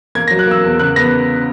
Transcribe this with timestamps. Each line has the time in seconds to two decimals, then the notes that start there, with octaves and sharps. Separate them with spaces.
0.15 A#3 G#6
0.28 F#3 A#6
0.39 F#6
0.47 A#3 E6
0.64 E2
0.79 C#3 F#6
0.96 B3 A#6